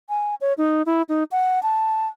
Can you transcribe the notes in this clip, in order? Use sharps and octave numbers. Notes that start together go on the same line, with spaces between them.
G#5
C#5
D#4
E4
D#4
F#5
A5